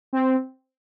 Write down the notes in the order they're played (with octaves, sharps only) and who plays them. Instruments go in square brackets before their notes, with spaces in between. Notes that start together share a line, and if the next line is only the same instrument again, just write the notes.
[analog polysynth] C4